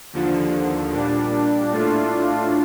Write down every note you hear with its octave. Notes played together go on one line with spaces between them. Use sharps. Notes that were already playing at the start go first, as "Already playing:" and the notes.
D#2 D3 F3
A#2 G3 D4
A2 A3 D4 F4